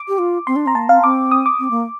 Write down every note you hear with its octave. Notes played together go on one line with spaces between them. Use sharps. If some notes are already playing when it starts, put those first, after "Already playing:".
Already playing: D6
G4
F4
C4 C6
D4
C4 A#5
A#3 A5
C4 F5
C4 D6
D#6
D6
C4
A#3